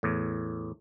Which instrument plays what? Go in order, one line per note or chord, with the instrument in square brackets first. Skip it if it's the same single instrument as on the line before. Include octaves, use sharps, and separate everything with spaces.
[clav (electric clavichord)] E2 A2